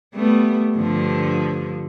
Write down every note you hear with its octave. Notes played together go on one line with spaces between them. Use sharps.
G3 A3 B3
G2 D3 F3